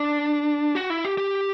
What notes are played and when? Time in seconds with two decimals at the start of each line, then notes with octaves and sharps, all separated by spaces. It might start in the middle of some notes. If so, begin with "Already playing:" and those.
Already playing: D4
0.75 F#4
0.90 E4
1.04 G4
1.18 G4